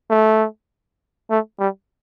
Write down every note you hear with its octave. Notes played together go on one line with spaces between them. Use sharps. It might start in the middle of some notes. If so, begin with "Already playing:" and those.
A3
A3
G3